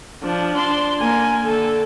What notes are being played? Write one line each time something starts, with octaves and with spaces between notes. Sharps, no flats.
F3 D4
D4 C6
A#3 G#5
D3 A4